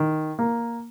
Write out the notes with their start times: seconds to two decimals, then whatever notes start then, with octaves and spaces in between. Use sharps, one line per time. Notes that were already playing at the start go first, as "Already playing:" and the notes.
Already playing: D#3
0.39 A#3